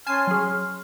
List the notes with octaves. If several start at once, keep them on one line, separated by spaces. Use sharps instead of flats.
C#4 G#5 A5 C6 F6 C7
F#3 G#4